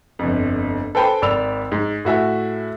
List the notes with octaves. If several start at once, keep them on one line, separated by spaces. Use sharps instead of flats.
G1 F2
A4 B4 C5 G5 G#5 B5
G#1 D5 B5 E6 F7
G#2
A2 F#4 E5 G#5